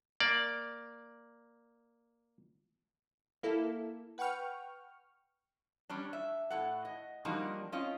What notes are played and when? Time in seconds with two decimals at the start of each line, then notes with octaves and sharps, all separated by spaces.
0.20 A#3 D5
3.43 A#3 E4 A4
4.18 B4 F#5 G5 C#6 F6
5.90 G3 C#4 D4
6.13 E5
6.50 A2 A4 F#5
6.85 D#5
7.25 F3 G3 A#3 D4 D#4 F#4
7.72 C4 C#4 F4 D#5